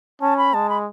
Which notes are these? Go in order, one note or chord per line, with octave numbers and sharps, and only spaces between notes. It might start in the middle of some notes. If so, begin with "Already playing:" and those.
C#4 A5
B5
G#3 A5
B5